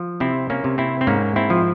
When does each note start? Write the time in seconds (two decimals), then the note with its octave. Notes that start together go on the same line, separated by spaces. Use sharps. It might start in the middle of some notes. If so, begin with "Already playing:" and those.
Already playing: F3
0.20 C3 C4 E4
0.50 A#3 C#4
0.64 C3
0.78 C4 E4
1.01 C4
1.07 G#2 A#3 C#4
1.36 C4 E4
1.50 F3